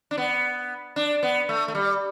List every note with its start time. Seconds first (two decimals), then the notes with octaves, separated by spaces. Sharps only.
0.11 D4
0.18 B3
0.96 D4
1.23 B3
1.49 A3
1.68 A3
1.75 G3